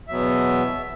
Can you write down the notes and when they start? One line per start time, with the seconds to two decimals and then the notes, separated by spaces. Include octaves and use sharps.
0.08 E2 B2 F#3 B3 E5